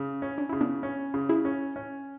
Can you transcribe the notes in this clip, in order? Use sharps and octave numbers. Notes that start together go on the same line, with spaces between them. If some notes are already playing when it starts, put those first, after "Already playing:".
Already playing: C#3
C#4
D4
C#3 E4
B3 D4
C#4
C#3
E4 G#4
C#4
C#4